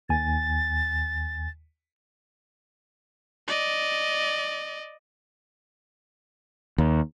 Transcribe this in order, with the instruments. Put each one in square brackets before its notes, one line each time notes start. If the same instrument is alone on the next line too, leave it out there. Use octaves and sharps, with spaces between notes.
[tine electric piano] D#2 G#5 [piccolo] A6
[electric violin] D5 D#5
[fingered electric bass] D#2